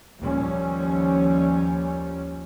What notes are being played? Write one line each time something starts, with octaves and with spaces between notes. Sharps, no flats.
D#2 F3 G3 C#4